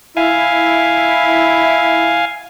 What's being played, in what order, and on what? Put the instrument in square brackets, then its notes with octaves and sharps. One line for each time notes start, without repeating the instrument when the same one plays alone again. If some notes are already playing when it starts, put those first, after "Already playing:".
[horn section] E4 [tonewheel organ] F5 G#5